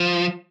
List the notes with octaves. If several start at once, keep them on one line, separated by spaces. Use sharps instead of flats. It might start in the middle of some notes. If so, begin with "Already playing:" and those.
Already playing: F3